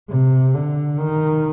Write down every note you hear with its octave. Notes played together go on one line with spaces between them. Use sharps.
C3
D3
D#3